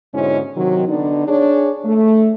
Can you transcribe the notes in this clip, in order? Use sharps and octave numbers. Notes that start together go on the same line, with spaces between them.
G#2 B2 D3 G#3 C#4 E4
C3 D#3 F#3
D3 B3 D4 D#4
D4 G#4 C#5
A3